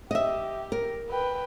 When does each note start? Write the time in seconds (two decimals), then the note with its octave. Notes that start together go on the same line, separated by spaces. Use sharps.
0.11 G4 D#5 E5
0.72 A#4
1.11 B4 G5